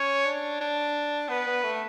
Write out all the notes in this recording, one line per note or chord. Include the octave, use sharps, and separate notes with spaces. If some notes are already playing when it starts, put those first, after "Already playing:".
Already playing: C#4 C#5
D4
D4
B3 B4
B3
A3